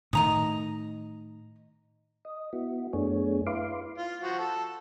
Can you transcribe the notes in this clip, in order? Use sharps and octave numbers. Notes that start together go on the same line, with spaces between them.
A2 D#3 D#5 A#5 D#6
D#5
B3 E4 F#4
F#2 A3 B3 D4 G#4 C#5
E4 B4 F5 C6 D6
F4
F3 F#4
A4